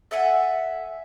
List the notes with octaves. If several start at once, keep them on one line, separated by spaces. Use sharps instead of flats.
A4 E5 F#5 G#5